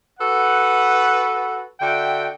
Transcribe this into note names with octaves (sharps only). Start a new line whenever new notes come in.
F#4 A4 B4 F#5
D3 F#4 E5 G5